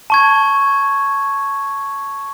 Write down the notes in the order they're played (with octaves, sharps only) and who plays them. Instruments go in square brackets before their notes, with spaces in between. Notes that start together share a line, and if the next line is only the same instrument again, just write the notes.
[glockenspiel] A5 C#6 G#6